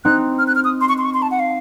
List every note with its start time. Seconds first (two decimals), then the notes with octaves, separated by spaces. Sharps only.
0.05 C4 D#4 F#6
0.39 F6
0.47 F#6
0.55 F6
0.64 D#6
0.81 C6
0.89 C#6
0.98 C6
1.05 C#6
1.14 C6
1.22 A5
1.31 F#5
1.39 F5